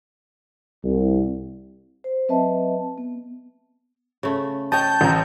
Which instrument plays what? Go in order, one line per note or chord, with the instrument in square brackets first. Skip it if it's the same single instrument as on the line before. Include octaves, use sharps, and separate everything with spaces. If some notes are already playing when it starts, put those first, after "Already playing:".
[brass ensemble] C2
[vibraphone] C5
F#3 C4 B4 D#5 E5 A5
B3
[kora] C#3 A3
[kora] C#5 D#5 [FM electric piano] G5 A5 [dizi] G6
[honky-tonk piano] A1 A#5